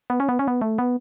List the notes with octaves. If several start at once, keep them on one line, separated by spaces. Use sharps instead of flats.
B3
C#4
B3
C#4
B3
A3
B3